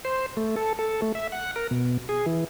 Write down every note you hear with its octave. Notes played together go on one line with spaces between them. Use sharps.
C5
A3
A4
A4
A3
E5
F#5
A#4
B2
G#4
E3